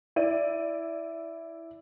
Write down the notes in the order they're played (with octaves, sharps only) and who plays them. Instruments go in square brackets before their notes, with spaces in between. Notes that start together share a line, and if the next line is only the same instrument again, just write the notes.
[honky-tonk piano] E4 D5 D#7